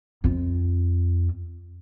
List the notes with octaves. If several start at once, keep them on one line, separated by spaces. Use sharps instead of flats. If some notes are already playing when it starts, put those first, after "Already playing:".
F2 F4